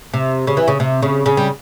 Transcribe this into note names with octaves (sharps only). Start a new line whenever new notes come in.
C3
C#3
E3
C#3
C3
C#3
C#3
G3